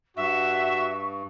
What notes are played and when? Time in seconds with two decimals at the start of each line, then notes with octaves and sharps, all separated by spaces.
0.17 G2 F#4 E5 C#6